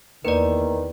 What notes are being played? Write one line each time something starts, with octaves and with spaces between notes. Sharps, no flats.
E2 D#3 A#3 B4 D5 A#5